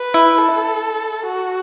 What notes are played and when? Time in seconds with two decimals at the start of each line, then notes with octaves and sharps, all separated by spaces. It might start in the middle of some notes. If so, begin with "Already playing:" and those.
Already playing: B4
0.14 E4
0.38 A4
1.26 F#4